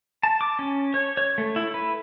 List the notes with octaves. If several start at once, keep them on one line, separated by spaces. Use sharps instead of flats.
A5
D6
C#4
C#5
C#5
A3
E4
B4